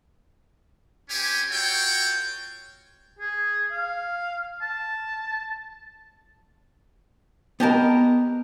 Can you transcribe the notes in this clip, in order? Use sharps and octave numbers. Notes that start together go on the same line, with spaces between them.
C4 C#4 G4 G#5
F4 F#4 A4 C#5 G5
G#4
F5
A5
B3 G4 A#4 D#5 A5